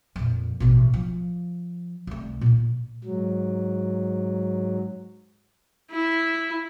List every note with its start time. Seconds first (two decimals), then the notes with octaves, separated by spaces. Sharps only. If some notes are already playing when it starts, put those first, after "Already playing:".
0.16 F2 A#2
0.60 A1 B2
0.93 F3
2.07 C2 A3
2.41 A#2 D3
3.04 G#2 F#3
5.92 E4